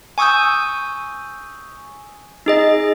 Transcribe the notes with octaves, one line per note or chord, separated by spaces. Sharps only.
G#5 C#6 D#6 E6 G6
D#4 G#4 D#5